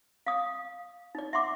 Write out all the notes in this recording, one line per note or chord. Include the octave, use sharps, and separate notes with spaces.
F5 D#6
D#4 D5
E5 F#5 C6 D6